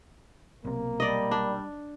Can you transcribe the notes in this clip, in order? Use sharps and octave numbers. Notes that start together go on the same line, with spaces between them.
B1 C3 A#3
G3 D5 D#5
D4